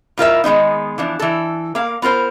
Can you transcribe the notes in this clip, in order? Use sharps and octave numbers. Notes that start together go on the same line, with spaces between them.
A2 F4 A#4 E5
D#3 G#3 B3 D#4
E3 F3 D4
E3 A4
A#3 A#4 F5
B3 F4 A#4 C5